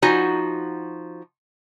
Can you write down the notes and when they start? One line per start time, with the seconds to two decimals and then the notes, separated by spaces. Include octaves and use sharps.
0.02 F3 D#4 F#4 G#5